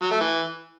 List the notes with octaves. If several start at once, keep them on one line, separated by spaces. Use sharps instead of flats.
F#3
A3
E3